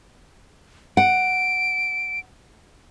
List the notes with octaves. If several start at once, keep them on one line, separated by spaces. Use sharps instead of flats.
F#5 D7